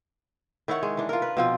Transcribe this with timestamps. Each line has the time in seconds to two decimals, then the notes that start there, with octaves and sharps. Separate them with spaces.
0.68 D#3 E4 C#5 F#5
0.83 G#3
0.97 E3 D4
1.09 F4 A#4
1.22 B4
1.37 B2 F3 C4